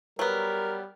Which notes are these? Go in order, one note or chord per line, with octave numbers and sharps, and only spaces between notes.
F#3 G3 B3 A#4